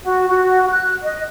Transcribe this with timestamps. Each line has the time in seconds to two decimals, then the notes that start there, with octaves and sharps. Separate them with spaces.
0.03 F#4
0.28 F#4
0.70 F#6
1.02 D#5